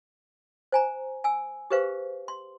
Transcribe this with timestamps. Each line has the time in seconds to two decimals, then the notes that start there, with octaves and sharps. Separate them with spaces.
0.72 C5 G#5 A#5
1.24 G#5 E6
1.70 G4 G#4 B4 C5 F5
2.28 C6